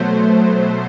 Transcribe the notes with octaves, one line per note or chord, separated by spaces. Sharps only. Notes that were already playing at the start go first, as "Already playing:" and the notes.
Already playing: B2 F#3 A3 C5